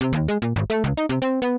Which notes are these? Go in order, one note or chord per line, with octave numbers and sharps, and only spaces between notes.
C3
D#2
G#3
A#2
G#1
A3
C#2
D#4
C3
C4
B3